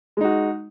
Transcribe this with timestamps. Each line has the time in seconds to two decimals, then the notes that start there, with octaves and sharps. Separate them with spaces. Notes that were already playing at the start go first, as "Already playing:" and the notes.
0.17 G#3
0.21 D#4
0.24 F#4